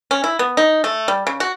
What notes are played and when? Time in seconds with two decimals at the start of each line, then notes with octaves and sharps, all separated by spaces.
0.11 C#4
0.24 E4
0.39 B3
0.57 D#4
0.84 A3
1.08 G3
1.27 C#3
1.40 F#4